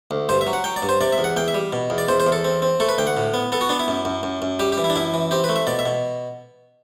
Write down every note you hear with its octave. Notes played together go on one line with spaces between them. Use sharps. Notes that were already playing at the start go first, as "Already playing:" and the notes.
D2
G2 C5
E5
F#3
F#5
F#3 G5
D5
G2
C5
C3 D5
E5
E2
F#5
E2 G5
E5
G3
B2
E2
D5
E2 C5
C5
E2
A4
C4
C4
A3 A4
B4
D2 G5
F#5
A2
B3
B3 A4
F#4
B3 D4
E4
F#2
F#2
F#2
F#2
G3 G4
G4
E3
E4
D4
F#2 E4
E3
C4 G4
B4
A3
E5
B2 D5
E5
B2